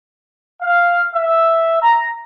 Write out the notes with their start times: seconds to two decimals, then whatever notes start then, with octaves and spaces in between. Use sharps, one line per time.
0.62 F5
1.13 E5
1.82 A#5